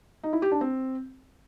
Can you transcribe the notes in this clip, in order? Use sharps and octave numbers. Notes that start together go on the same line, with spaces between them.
D#4
E4
G4
D4
C4